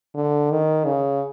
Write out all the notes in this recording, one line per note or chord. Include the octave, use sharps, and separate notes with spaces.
D3
D#3
C#3